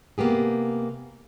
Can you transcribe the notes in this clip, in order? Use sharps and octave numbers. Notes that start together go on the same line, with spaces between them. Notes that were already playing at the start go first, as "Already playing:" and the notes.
C3 A#3 B3 G4 G#4